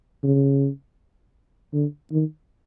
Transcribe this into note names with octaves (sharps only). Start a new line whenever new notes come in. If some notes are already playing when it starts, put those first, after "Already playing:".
C#3
D3
D#3